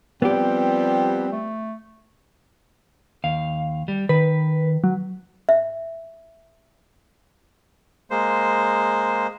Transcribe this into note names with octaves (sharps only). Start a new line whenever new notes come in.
F3 G3 B3 C4 G4
A3
D#2 F5
G3
D#3 B4
F#3
E5
G#3 A#3 C5